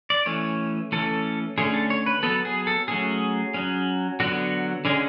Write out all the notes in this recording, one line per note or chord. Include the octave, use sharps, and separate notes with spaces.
D5
E3 A3 C#4 C#5
E3 A3 C#4 A4
D3 A3 C#4 G#4
A4
C#5
B4
F#3 B3 A4
G#4
A4
F#3 A3 C#4 G#4
F#3 C#4
D3 F#3 B3 F#4
D3 G#3 C#4 G#4